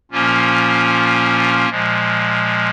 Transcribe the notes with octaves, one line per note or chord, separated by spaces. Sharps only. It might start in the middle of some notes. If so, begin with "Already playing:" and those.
A#2 F3 A#3 C#4 F4
A#2 F3 G#3